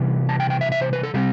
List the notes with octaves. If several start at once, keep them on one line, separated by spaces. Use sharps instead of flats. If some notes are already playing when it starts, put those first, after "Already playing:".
Already playing: C3 E3 G3 B3
A5
G5
G5
E5
E5
C5
B4
A4
C3 G3 C4 G4